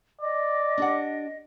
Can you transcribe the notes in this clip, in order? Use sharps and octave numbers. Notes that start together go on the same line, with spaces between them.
D5 D#5
D4 G4 F#5